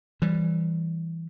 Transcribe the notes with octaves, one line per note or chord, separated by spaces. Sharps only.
E3 G3